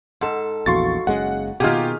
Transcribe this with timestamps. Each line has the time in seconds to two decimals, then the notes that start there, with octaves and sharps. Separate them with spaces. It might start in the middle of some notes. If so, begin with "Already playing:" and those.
0.21 G#2 A4 F#5
0.66 A#1 E2 F#4 F5 C6 C#6 A6
1.07 F#1 G#3 C#4 F#5
1.60 B2 D#3 A#3 F4 G4 G#4 F#5 F6